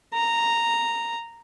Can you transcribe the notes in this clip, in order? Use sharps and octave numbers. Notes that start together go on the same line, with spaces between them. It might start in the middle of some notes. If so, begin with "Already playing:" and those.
A#5